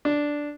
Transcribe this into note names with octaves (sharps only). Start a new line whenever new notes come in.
D4